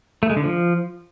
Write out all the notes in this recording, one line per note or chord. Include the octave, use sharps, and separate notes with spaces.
A3
G#3
D3
F3